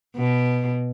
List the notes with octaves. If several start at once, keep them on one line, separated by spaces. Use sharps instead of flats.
B2